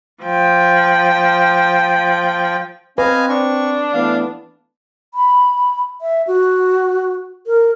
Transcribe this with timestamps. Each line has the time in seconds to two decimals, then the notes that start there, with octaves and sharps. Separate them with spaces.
0.23 F3 G5
2.98 C4 B4 D#5 F5 G#5
3.29 D4 C#6
3.94 E3 A3 B3 F5
5.14 B5
6.01 E5
6.27 F#4
7.47 A#4